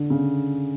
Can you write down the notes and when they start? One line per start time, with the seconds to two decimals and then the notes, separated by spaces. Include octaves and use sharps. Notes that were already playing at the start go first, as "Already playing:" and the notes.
Already playing: D3
0.10 C#3